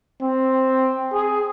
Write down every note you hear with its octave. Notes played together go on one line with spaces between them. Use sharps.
C4
G#4